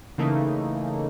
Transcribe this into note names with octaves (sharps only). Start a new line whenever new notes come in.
C#3 E3 A3 A#3 D#4